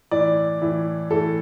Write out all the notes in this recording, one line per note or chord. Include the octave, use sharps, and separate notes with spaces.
A2 E3 D5
A2 E3
A2 E3 A4